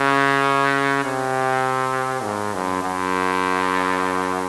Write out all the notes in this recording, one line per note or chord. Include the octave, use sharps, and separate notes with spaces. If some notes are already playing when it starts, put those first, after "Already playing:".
Already playing: C#3
C3
G#2
F#2
F#2